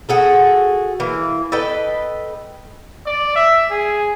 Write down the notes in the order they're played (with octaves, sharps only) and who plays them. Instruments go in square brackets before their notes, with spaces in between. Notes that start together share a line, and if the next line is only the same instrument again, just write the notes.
[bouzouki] F#4 G#4 A4
E3 A#3
A4 B4 D#5 G5
[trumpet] D5
E5
G#4